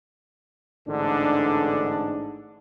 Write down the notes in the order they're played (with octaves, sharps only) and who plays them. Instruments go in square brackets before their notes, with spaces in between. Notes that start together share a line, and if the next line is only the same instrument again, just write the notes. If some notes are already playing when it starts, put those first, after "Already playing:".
[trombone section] A1 G#2 D3 D4